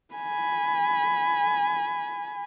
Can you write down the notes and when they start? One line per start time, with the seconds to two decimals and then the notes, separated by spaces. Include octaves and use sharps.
0.14 G#5 B5